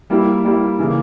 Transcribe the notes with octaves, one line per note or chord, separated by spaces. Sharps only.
G3 A#3 E4 G4
G3 A#3 E4 G4
C#3 E3 A#3